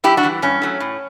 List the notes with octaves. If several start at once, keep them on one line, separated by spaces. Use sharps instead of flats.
F#2 E4 G4
D4 F#4
E3 G3
G2 C#4
F#3 A3
A2